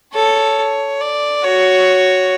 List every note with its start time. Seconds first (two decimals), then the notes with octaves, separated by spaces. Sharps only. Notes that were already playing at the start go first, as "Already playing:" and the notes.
0.13 A4 C#5
1.00 D5
1.44 F#4 C#5